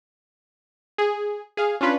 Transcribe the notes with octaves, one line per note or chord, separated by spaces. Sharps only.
G#4
G#4 F5
C#4 D4 F4 B4